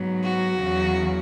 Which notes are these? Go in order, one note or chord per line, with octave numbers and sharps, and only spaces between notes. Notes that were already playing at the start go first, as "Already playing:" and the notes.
Already playing: G#2 F#3 B3
F#4
E2 C#3 F#3